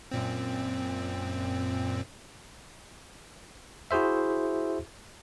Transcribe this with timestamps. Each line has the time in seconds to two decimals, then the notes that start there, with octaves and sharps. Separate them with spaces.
0.11 F#2 A#2 C4
3.91 E4 F#4 G#4 C5 E5